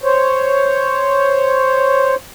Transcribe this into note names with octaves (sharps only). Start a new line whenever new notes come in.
C5 C#5